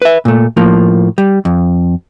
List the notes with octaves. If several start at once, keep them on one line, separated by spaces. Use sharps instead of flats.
B4 E5
A#2 A3
A2 F3 A#3
G3
F2